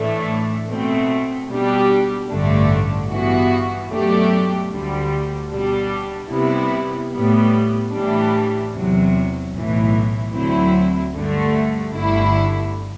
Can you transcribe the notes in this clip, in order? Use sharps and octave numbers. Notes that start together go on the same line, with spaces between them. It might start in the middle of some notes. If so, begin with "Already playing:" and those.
Already playing: A2 E3 A3 D4
B2 A3 C4
B2 G3 D4 G4
A1 G2 D3 A3 D4
G2 E3 B3 F#4
B2 F#3 A3 D4 G4
D2 D3 G3
B2 G3 D4
C3 G3 B3 E4
A2 G3 B3
A2 E3 G3 D4
E2 C3 F#3
B1 A2 E3
D2 D3 F#3 C4 E4
G2 D3 A3
G1 G2 D3 A3 E4